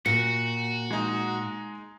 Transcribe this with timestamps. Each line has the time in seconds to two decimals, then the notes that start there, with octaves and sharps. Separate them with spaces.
0.06 A#2 F#4 C#7
0.91 G#3 D#4